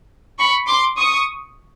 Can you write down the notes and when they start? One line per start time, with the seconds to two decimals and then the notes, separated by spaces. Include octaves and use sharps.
0.39 B5 C#6
0.67 C6 D6
0.98 C#6 D#6